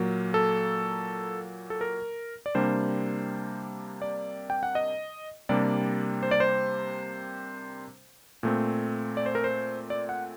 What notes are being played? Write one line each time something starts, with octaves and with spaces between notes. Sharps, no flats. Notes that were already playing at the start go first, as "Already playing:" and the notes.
Already playing: A#2 F#3 A#3
A4
A4
A#4
D5
C3 G3 A#3 D4 C5
D5
G5
F#5
D#5
C3 G3 A#3 D4 D5
C5
D5
C5
A#2 A3 C4
D5
C5
A#4
C5
D5
F#5